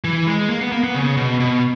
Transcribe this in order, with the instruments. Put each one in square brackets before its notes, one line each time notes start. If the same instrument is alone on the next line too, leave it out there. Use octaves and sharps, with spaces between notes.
[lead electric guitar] E3
G#3
A#3
B3
A#3
B3
C#3
B2
B2